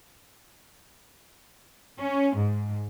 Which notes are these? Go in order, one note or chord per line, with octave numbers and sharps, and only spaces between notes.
C#4
G#2